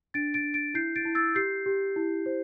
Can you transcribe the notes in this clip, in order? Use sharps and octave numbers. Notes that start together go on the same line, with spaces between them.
D4 A6 D7
A6 D7
D4
A6 D7
E4 G6 C7
A6 D7
E4
E6 A6
G4 G6 C7
G4
E4
C5